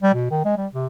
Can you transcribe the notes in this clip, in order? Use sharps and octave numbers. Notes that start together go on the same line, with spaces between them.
G3
B2
D#3
G#3
G3
C3